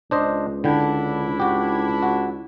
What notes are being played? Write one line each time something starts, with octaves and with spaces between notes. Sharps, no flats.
C#2 D4 C5 D#5
D3 D4 E4 G5
F#4 G4
F#4